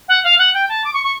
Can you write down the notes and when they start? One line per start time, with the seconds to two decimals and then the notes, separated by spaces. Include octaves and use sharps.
0.08 F#5
0.24 F5
0.39 F#5
0.54 G5
0.69 A5
0.85 D6
0.94 C#6
1.04 C#6